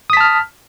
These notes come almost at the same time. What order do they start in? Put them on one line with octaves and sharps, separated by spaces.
D#6 B6 A5 F6